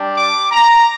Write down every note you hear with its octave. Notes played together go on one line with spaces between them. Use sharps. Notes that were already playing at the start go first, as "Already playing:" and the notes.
Already playing: G3 D4 G4
D6
A#5